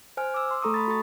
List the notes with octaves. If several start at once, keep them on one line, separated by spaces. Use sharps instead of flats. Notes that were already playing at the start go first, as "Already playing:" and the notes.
C5 G#5 F6
D6 E6
C6
A3 A4 A#5 C#6 D#6
B5 A6
F#4 A4 C#6 A6